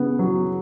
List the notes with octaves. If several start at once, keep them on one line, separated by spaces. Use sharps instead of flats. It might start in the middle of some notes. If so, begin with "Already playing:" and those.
Already playing: C#3 B3
F#3